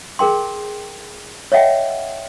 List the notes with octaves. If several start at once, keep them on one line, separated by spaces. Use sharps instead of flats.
G#4 A#4 G5 C6
C#5 D#5 E5 F#5 G5